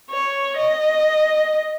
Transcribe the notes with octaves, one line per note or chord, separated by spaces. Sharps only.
C#5
D#5